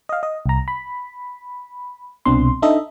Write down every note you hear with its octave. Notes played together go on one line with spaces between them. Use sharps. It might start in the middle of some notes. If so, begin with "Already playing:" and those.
D#5 F5
D#5
C2 A#5
B5
C2 B2 C4 D4 C6
D4 D#4 A4 D#5 E5